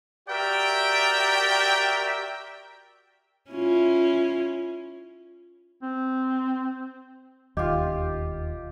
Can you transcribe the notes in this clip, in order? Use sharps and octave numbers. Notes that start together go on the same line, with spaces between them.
F#4 G4 A#4 D5 E5 G5
C#4 E4 F4
C4
E1 D#2 F4 G4 D#5